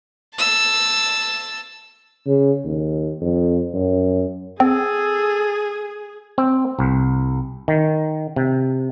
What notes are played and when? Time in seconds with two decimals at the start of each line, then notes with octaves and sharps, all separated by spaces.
0.36 A5 E6
2.26 C#3
2.65 D#2
3.21 F2
3.74 F#2
4.60 C4 G#4 A4
6.38 C4
6.79 C2
7.68 D#3
8.36 C3